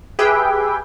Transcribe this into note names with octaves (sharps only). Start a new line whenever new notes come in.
G4 G#4 B4 E5 G5